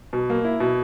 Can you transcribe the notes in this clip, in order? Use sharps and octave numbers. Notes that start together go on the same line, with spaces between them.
B2
A#3
E4
B2